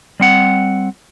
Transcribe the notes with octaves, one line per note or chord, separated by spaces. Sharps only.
G3 C4 F#5